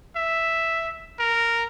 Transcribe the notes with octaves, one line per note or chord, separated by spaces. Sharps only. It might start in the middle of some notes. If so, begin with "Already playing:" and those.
E5
A#4